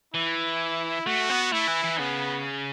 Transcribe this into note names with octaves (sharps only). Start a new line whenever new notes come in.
E3 E4
A3 F#4
B3
A3 E4
E3
E3
C#3 B3